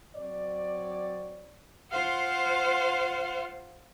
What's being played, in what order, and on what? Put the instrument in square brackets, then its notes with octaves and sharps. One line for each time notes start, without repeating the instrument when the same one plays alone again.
[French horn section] F#3 C4 C#5 D5
[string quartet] F4 C5 F5 F#5 C6